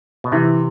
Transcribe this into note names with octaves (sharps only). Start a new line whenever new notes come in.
B2
C3 E3